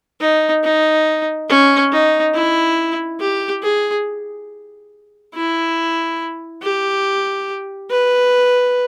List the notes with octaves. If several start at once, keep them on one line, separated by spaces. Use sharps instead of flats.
D#4
D#4
C#4
D#4
E4
G4
G#4
E4
G4
B4